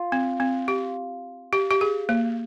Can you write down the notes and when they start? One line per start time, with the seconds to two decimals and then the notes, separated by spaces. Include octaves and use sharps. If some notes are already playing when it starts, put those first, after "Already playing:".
Already playing: F4
0.12 C4
0.40 C4
0.68 G4
1.53 G4
1.71 G4
1.81 G#4
2.09 A#3